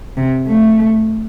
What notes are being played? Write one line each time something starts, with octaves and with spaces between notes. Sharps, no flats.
C3
A3